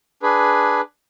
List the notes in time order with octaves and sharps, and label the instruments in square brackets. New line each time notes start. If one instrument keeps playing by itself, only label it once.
[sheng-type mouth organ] D4 G#4 B4